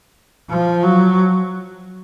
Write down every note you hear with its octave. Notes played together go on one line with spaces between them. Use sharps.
F3
F#3